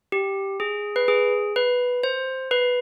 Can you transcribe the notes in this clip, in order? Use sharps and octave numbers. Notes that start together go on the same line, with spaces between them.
G4
G#4
B4
G#4
B4
C5
B4